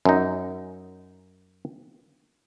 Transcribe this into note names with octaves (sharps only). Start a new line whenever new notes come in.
F#2 D#4